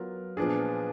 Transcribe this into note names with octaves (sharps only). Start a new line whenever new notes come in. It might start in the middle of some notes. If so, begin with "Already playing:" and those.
Already playing: F#3 B3 F4 A#4
A#2 F3 B3 D4 G#4